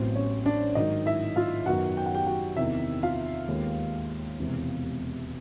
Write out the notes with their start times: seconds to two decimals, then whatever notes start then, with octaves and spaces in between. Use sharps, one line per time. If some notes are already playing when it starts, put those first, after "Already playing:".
Already playing: A1 A2 F#3 B3 C4 C5
0.15 C#4 C#5
0.46 D4 D5
0.75 G#2 D#3 F#3 D#4 D#5
1.06 E4 E5
1.36 F4 F5
1.66 F#2 D#3 F#3 B3 F#4 F#5
1.97 G5
2.06 F#5
2.14 G4 G5
2.26 F#4 F#5
2.57 E2 C3 D#3 E4 E5
3.03 F4 F5
3.48 D#2 D#3 G#3 B3
4.38 E1 E2 C3 E3 G#3